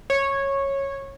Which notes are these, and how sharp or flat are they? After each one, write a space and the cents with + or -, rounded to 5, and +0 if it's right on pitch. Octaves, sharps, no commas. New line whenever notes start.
C#5 -10